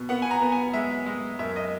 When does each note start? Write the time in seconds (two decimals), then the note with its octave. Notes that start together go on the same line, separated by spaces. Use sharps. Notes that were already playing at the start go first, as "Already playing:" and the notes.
Already playing: B2
0.09 B3 F#5
0.22 G#5
0.31 A#5
0.42 B3
0.52 G#5
0.74 G#3 E5
1.06 G#3
1.39 F#2 E5
1.56 D#5